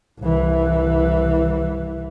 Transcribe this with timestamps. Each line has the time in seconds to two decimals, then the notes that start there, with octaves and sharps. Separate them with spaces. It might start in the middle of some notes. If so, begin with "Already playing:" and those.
0.20 C2 E3